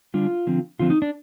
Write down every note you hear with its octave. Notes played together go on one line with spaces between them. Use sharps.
D3 G3 D4 F4
D3 F3 C4
D3 F3 C4 F4
D#4
D4